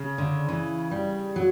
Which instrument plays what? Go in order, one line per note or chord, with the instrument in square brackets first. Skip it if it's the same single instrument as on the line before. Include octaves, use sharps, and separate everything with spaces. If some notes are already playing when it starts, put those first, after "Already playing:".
Already playing: [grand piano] C#3
[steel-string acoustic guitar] D3
E3
G3
F#3